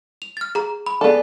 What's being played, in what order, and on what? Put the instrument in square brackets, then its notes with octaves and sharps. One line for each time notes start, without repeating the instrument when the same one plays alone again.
[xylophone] F7
F6 A6
G#4 A#5
B5
[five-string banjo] B3 A4 [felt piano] G#4 D5